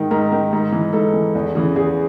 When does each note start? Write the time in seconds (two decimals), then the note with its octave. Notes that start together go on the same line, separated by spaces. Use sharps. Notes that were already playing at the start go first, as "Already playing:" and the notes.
Already playing: G#2 D#3
0.11 G#2 A#4
0.32 D#3
0.53 G#2
0.72 E3
0.93 G#2 A4
1.14 E3
1.35 E2
1.55 C#3 E3
1.76 E2 G#4